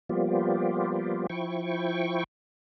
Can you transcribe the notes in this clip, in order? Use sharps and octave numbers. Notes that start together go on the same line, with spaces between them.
F3 G3 A#3 B3 F4 G4
F3 E4 G5 C#6